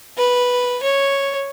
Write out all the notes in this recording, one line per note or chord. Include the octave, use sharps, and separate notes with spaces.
B4
C#5